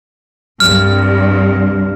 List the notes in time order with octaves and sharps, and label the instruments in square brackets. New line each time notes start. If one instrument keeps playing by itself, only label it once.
[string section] C2 G2 [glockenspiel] F6